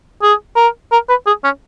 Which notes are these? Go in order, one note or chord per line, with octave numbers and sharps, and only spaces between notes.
G#4
A#4
A#4
B4
G#4
C#4